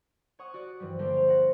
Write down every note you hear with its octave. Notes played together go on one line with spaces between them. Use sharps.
C#5 F#5 C#6 D#6
F#4 D5 D#6 F#6
G2 E3 F3 G3
D3 F3 G3 A#3 D4 C5
F5
D5 F#5 A#6